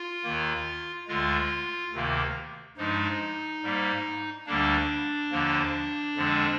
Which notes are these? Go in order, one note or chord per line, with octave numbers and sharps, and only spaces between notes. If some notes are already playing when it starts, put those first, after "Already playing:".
Already playing: F4
D#2 D#3 A#3
D2 D3 G#3 F4
D2 C3 D#3 A#3
G2 F3 G#3 D#4
G#2 G3 A#3
D2 D3 G3 A#3 D4
D#2 D3 F3 A#3
F2 D3 F3 G#3